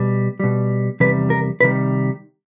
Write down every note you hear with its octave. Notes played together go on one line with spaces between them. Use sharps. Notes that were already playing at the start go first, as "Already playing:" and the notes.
Already playing: B2 G3
B2 G3
E2 C3 D#3 G3 B4
A#4
C3 D#3 G3 B4